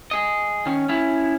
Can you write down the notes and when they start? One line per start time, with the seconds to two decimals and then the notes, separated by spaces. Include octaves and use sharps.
0.11 G#4 D#5
0.66 D#3 C#4
0.89 C#4 E4